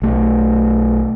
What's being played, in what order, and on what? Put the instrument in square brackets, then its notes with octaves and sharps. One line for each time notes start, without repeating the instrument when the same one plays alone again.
[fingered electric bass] B1 A3